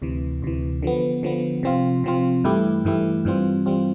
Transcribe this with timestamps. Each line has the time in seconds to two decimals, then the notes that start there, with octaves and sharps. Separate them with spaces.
0.02 D2 C3 E3
0.42 D2 C3 E3
0.83 D3 F3 B3
1.23 D3 F3 B3
1.63 C3 F3 C4 F4
2.04 C3 F3 C4 F4
2.44 G2 E3 A3 E4 G4
2.85 G2 E3 A3 E4 G4
3.25 G2 E3 G3 C4 F4
3.66 E3 G3 C4 F4